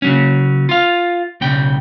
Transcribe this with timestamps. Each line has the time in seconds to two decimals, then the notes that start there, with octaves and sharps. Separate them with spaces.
0.02 C#3 F#3 C#4
0.69 F4 F5
1.41 B1 C#3 G5